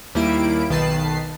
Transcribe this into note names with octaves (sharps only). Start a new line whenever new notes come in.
D#2 G3 A#3 E4 D7
B1 D#3 B4 A5 C7